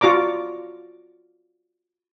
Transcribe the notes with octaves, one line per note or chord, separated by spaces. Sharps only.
F4 F#4 D5 A#5 D6